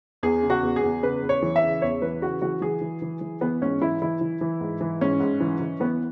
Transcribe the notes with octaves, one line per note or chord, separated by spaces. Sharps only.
E2 G#4
C#3
F#4
E2
G#4
E2
C#3 B4
E2
C#5
E3
E5
C#3
E2 C#5
E3 B4
C#3 F#4
E3 F#4
E3 G#4
E3
E3
E3
E3 B3
G#2 C#4
E3 E4
E3 E4
E3
E3
G#2
E3
G#2 C#4
G#2
E3
E3
E3 B3